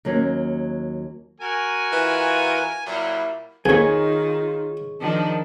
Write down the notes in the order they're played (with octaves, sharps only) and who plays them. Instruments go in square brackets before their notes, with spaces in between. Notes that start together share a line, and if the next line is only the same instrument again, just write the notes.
[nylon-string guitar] D#2 F#3 A#3 C#4
[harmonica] F#4 A#4 [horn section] G#5
[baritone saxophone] E3 [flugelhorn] F4
[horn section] A#2 G3 [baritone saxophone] F#3 [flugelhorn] E4
[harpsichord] F2 A#2 [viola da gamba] D#3 [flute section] D#4 F4 [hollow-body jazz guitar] G#4 C#5
[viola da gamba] D#3 F3 D4 [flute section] D#4 A#4 A5